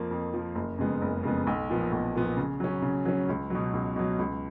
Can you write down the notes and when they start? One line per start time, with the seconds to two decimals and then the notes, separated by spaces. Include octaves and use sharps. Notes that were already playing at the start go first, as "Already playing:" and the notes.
Already playing: F2 F3 A#3
0.11 F2
0.34 F3 A#3
0.55 F#1
0.78 F2 C#3 G#3 B3
1.02 F#1
1.23 F2 C#3 G#3 B3
1.47 B1
1.70 A#2 F3 B3
1.92 B1
2.15 A#2 F3 B3
2.37 C#3
2.60 F#3 C#4
2.82 C#3
3.05 F#3 C#4
3.29 C#2
3.50 B2 F#3
3.73 C#2
3.96 B2 F#3
4.19 C#2